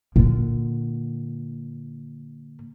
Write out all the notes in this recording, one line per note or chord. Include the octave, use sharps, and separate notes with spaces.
A#2 D3